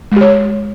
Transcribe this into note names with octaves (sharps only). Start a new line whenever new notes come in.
G#3 G4 C#5